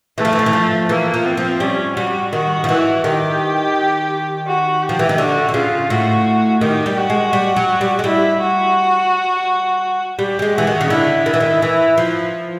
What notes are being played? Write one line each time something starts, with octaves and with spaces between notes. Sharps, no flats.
E3 A3
F3
E3
F3
E3
F3
E3 A#3
F3
C4
F3
G3 C#4
G3 F#4
D#3 F#4
F3
E3 F#4
D#3 G4
F#4
G4
F3
E3
D#3
D3 F#4
D3
C#3 F4
A2 F#4
D#3 G4
G3
F#4
G#3
G3
F#3
G3
G#3
G3 E4
F#4
G3 G4
G3
G#3
E3 F#4
D#3
C#3
D3 E4
D#3
E3
D#3
E3
F3